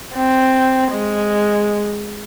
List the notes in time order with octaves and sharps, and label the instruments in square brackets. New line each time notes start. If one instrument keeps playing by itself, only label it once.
[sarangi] C4
G#3